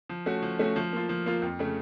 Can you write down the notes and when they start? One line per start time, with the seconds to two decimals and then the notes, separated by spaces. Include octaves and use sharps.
0.09 F3
0.26 A3 C#4 F#4
0.42 F3
0.59 A3 C#4 F#4
0.76 F3
0.93 A#3 F4
1.09 F3
1.26 A#3 F4
1.42 F2
1.59 C#3 A3